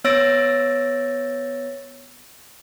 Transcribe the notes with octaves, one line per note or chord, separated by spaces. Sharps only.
B3 C#5 E6 A6 A#6 D7